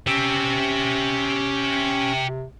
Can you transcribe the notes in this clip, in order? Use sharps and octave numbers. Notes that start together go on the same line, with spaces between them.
C#4 G4 E5
C3